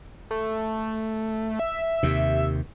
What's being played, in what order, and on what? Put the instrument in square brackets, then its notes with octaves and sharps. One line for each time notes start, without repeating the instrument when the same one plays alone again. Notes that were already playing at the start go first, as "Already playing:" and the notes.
[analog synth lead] A3
E5
[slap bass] D#2 C3